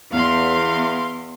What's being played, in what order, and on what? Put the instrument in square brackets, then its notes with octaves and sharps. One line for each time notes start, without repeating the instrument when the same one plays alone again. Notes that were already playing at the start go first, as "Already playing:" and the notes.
[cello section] E2 [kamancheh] F5 C6